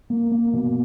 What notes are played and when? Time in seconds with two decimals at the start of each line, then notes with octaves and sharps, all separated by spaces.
0.10 A#3
0.31 A#3
0.53 B2